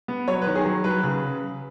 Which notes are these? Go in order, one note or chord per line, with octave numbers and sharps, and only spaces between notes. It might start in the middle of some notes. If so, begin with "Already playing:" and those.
B3
F#3 C#5
B4
D#3
G#4
F#3
F#3 B4
C#3